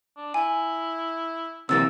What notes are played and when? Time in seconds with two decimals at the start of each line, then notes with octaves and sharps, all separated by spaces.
0.17 D4
0.34 E4 G#5
1.69 C3 E3 F#3 A#3 E6 A6